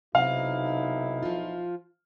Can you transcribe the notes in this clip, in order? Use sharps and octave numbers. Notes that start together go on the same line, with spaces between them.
B1 C3 F#3 D#4 E4 F5
F3 F4